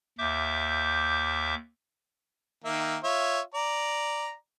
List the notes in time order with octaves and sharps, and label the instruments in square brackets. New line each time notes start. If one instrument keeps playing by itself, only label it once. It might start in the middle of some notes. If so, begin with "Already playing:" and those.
[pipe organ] D#2 E5 D6 G6
[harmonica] D#3 A#3 E5
F4 C#5 E5
D5 A#5